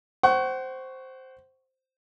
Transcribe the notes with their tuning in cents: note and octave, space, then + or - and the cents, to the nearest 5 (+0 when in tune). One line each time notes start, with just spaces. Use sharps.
C5 +0 F#5 +35 C#6 +0